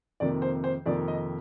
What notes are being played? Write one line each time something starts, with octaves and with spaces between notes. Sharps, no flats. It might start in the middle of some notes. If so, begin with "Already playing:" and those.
F2 C3 D#3 A#3 D5
C5
C5
F2 C3 D#3 A#3 D5
D#5